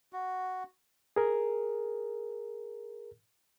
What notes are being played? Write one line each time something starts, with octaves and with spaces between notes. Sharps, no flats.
F#4
G#4 A#4